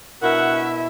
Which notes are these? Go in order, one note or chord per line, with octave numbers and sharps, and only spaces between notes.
B2 D4 E4 F#4 A#4 E5 F#5